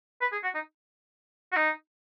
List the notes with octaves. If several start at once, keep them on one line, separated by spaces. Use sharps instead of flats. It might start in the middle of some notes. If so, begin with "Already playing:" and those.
B4
G#4
F#4
D#4
F#4
D#4